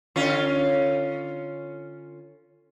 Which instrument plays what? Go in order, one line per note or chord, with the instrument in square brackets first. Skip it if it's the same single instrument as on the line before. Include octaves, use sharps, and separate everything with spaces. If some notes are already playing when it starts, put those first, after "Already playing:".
[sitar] D3 C#4 F4